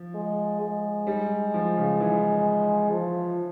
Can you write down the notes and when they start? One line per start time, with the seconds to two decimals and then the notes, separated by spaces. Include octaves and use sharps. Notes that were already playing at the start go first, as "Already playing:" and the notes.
Already playing: F3
0.14 G#3
0.61 G#3
1.07 G3
1.54 F3
1.77 C#3
2.00 E3
2.91 F3